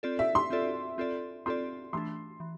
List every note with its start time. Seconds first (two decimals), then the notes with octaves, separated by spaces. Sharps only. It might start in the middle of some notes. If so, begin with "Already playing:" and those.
0.03 C4 F4 A4 D5
0.19 E5
0.35 C6
0.50 C4 F4 A4 D5
0.98 C4 F4 A4 D5
1.46 C4 F4 A4 D5 C6
1.93 E3 A3 D4 C6
2.40 E3